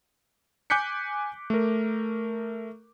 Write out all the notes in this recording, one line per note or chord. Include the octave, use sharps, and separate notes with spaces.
G#5 D6 F#6 G6 B6 C#7
A3 A#4